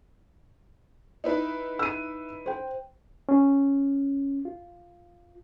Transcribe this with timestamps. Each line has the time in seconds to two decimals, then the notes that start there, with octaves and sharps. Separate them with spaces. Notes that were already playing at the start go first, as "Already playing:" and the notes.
1.24 D#4 E4 B4
1.79 E6 D#7
2.46 C5 G5
3.29 C#4
4.45 F4